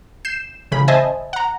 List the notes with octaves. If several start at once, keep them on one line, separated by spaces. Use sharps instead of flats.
G6 C7 E7
A1 C#3 B5
C5 D#5 E5 G#5 A5
F#5 A#5